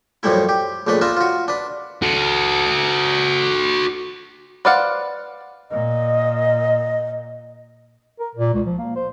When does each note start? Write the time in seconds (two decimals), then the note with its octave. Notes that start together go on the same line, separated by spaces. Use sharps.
0.23 F#2 A2 F3 G3 A3 E4
0.49 G4
0.87 A#1 C#3 A3 D4 B4
1.01 D4 D#4 F4 B4 E5
1.17 F4 F#4
1.48 D4 B4
2.02 F#4 A4
4.65 B4 C5 D5 F5 F#5
5.71 A#2 D#5
8.20 A#4
8.35 A#2
8.54 C#2
8.67 F3
8.78 A#3
8.96 C5